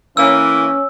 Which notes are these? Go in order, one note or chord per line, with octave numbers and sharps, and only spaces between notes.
E3 A#3 C#4 E6